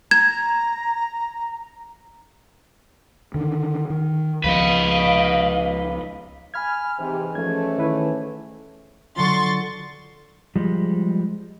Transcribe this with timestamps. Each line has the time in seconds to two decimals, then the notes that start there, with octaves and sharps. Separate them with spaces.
0.11 A#5 G#6
3.34 D3 D#3
3.90 D#3
4.44 C#2 F3 B4 D#5 F5
6.54 G#5 B5 F6 G#6
6.99 G#2 C3 E3
7.35 F3 A3 C#4 G#6
7.78 D#3 E4 B4
9.16 D3 F#3 F4 C6 C#6 A6
10.56 F3 G3 G#3